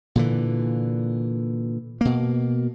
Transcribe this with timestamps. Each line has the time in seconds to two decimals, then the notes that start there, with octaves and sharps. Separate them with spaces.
0.15 A#2 D3 E3
2.01 B2 A#3